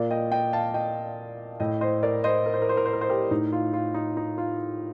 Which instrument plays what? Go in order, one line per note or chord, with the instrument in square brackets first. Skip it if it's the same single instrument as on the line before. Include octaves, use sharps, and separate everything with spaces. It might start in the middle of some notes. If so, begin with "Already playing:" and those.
Already playing: [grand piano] A#2 A#4 D5
D#5 G5
D#5 G5
F5 A5
D#5 G5
A2 D#5 G5
C5 D#5
A#4 D5
C5 D#5
A#4
C5
A#4
C5
A#4
C5
A#4
C5
G4 A#4
A2 D#4
F4
F4
D#4
D#4
F4